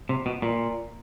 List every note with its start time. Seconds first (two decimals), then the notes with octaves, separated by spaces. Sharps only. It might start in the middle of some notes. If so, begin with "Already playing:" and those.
0.09 C3
0.26 B2
0.42 A#2